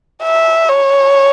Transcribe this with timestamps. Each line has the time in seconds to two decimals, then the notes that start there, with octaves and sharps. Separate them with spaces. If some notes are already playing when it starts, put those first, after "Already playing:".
0.24 E5
0.69 C#5